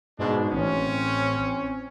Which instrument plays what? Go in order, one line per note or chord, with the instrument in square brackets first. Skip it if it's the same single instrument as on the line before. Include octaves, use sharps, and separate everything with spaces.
[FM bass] G#2 [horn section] B2 G#3 D4
[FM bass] A1 [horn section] C4 C#4